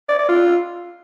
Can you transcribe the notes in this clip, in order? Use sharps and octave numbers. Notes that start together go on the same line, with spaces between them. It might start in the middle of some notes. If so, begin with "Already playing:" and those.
D5
D5
F4